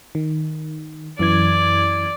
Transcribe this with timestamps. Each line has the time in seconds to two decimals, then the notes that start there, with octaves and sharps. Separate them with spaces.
0.15 D#3
1.19 F#2 E3 D5 G#6